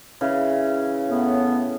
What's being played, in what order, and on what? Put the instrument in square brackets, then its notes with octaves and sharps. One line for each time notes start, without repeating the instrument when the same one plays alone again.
[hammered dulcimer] C#3 E3
[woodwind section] A2 B3